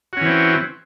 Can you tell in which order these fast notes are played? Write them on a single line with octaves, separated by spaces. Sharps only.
F#4 C#4 E3 C4